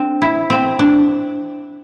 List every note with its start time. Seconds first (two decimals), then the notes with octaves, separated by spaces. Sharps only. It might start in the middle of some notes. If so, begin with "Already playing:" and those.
Already playing: C4 D4
0.22 E4
0.50 C4
0.79 D4